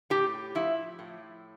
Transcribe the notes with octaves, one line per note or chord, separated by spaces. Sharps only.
A2 G4
F3 E4
A2